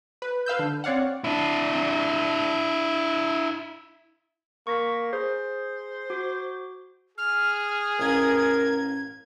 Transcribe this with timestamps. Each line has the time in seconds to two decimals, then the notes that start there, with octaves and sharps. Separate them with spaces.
0.22 B4
0.46 B4 F5 E6 G6
0.59 D3
0.84 C4 C#5 D5 F5 F#5
1.24 D4 E4
4.67 A#3 C#6 A#6 B6
5.13 G#4 C5
6.10 F#4 D6
7.18 G#4 F6
8.00 A1 F4 A#4 G#6